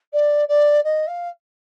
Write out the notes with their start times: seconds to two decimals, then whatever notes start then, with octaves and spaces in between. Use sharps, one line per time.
0.13 D5
0.48 D5
0.84 D#5
1.07 F5